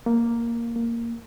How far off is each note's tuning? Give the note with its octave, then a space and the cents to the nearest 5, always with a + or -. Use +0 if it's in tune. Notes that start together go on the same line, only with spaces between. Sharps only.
A#3 +0
A#3 -5